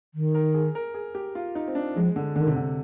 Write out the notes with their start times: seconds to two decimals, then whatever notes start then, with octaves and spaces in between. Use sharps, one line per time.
0.14 D#3
0.35 A#4
0.54 G#4
0.75 A#4
0.94 G#4
1.15 G4
1.35 F4
1.55 D#4
1.68 C4
1.75 D4
1.96 F3 G#3
2.16 D3
2.36 D3 D#3
2.47 C3
2.56 D3